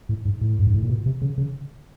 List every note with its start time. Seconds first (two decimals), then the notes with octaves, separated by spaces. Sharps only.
0.09 A2
0.25 G#2
0.41 A2
0.59 G2
0.67 G#2
0.74 A2
0.82 A#2
0.89 B2
1.06 C3
1.22 C#3
1.38 C#3